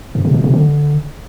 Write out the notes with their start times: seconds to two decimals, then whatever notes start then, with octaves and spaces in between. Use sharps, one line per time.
0.15 G2
0.25 C3
0.34 A#2
0.44 C3
0.54 D3